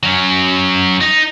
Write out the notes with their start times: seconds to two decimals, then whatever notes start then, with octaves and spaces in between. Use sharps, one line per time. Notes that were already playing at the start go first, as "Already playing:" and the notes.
0.03 F#3 C#4
1.01 D#4